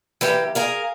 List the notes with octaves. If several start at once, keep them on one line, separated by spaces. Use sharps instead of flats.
E3 A#3 G4
G#4 A#4 F5